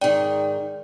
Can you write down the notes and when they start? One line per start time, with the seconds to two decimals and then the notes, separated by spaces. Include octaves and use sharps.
0.01 G#2 D#3 D5 G5